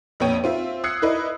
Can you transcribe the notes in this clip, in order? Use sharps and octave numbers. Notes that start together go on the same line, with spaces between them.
A#1 F2 B3 C#5 G5 D#7
C4 F4 E5
D#6 E6 F#6 G#6 C7 C#7
E4 A#4 B4 D5 D#5